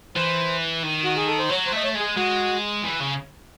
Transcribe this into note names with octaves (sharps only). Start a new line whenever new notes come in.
E3 C5
D#3
F#4
G#4
A4
C5
F#3 C#5
C5
A3 D#5
C#5
G#3 G#4
G#3 F#4
E3
C#3